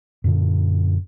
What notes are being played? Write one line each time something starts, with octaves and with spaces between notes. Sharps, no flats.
F#2 A#2 D3